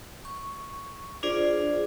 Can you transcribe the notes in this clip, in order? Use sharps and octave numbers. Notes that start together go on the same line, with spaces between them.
C#6
D4 F4 G#4 C5 D5